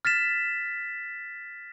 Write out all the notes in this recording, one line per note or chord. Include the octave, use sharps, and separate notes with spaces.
F6 A6 B6 E7